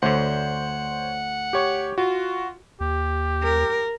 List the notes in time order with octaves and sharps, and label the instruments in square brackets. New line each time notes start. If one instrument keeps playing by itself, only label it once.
[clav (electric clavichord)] D2 D3 [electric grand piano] C5 C#5 [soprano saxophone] F#5
[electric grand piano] G4 C#5 C#6
[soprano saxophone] F4 [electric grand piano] F#4
[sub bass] D#2 [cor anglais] G4
[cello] A#4